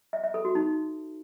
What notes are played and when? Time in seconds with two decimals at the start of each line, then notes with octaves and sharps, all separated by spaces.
0.13 E5
0.24 E5
0.34 A4
0.45 F#4
0.55 D#4